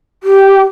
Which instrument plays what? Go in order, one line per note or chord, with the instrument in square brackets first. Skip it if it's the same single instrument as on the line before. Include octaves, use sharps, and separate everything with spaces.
[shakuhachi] G4